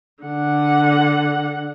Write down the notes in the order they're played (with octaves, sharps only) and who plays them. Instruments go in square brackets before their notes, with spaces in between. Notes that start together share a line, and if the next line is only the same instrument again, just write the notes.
[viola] D3 F#5